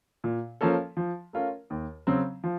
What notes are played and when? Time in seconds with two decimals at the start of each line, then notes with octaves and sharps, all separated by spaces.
0.24 A#2
0.61 F3 A#3 C#4 A4
0.97 F3
1.33 A3 C#4 F4 A#4
1.70 D#2
2.07 C#3 F#3 C4
2.44 F3